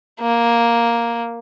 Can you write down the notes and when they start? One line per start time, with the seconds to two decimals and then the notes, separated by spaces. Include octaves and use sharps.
0.20 A#3